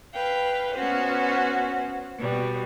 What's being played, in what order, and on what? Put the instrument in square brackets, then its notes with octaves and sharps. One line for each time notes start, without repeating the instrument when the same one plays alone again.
[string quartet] B4 F5 G5
B3 C#4 F#4 C5
B2 G3